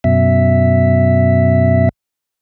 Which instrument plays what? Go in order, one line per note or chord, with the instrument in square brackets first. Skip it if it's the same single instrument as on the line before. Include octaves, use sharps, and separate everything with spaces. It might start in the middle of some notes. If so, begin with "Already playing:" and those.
[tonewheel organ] F#2 B2 E5